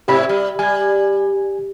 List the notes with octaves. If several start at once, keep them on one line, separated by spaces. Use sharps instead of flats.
G#2 C3 E4 G4 B5
G3
G3 G#5 G#6